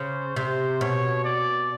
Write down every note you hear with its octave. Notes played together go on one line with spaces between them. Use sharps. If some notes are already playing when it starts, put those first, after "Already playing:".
Already playing: C#3 C5
C3 C5
B2 C#5
D5